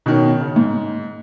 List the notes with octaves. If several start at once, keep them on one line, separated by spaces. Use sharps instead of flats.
B2 D#3 C#4
C#3
G#2